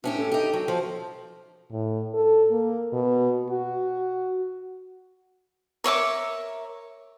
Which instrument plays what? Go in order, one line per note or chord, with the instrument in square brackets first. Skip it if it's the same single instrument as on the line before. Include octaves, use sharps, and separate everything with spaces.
[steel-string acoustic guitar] A2 C#4 G4 [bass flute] D4
[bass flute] A4
[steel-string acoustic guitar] D#4 G4
F#3
F3
[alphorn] A2
A4
A#3
B2
F#4
[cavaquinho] A#4 C#5 E5 D6